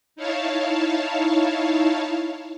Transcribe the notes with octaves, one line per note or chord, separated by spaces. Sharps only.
D#4 E4 C#5 F5 A5